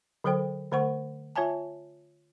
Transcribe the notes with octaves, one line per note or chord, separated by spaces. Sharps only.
D3 F#3 A4 C5 G5
D3 A3 C5 F#5 C#6
F4 C#5 E5 G#5 A5